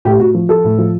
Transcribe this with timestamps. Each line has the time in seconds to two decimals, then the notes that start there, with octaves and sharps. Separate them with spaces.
0.05 A2 G4
0.19 A2 F#4
0.34 F3
0.49 F3 A4
0.64 A2
0.78 F3